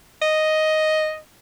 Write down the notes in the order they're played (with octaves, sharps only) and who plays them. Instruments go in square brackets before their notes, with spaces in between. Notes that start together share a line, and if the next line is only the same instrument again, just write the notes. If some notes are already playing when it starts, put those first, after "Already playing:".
[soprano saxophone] D#5